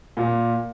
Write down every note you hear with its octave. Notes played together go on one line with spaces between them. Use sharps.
A#2